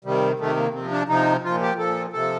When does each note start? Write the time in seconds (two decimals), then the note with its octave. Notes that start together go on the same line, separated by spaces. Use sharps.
0.05 C3 D#3 G3
0.39 C3 D#3 A3
0.57 A#3
0.74 C3 F3 C4
0.91 D4
1.09 C3 F3 D#4
1.44 A#2 F3 F4
1.61 G4
1.78 A#2 F3 A4
2.13 C3 F3 A4